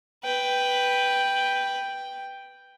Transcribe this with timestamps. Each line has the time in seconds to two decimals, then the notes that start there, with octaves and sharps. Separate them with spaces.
0.24 B4 G5